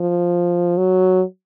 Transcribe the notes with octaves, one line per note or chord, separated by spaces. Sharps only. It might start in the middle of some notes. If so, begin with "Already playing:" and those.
Already playing: F3
F#3